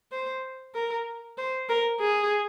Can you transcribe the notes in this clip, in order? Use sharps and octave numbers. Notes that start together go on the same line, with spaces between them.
C5
A#4
C5
A#4
G#4